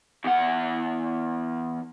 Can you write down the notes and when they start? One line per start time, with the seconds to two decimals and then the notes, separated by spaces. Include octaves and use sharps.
0.25 E2 F#5